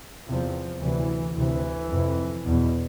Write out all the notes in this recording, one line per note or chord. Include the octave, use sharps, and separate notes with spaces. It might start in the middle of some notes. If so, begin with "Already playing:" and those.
E2 C3 F3
D2 C3 E3
D2 C3 E3
F2 C3
E2 B2